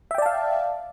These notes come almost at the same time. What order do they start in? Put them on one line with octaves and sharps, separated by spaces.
E5 G5 D5 A5 F5